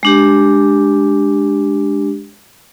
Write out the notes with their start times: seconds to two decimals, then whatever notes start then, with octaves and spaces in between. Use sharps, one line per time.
0.03 G#3 D4 G4